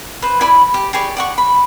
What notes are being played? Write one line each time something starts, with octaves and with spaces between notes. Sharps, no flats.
B4 C5
E4 D5 G#5 B5
G4 D6
G4 G#4 C#5 D5
D5 F#5 C#6
B5